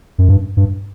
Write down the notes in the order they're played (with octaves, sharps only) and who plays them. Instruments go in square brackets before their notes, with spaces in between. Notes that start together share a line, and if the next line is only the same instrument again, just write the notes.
[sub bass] F#2
G2
G2